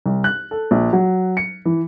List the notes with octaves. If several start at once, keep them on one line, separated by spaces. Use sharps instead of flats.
C2
F#6
A4
A#1
F#3
C#7
E3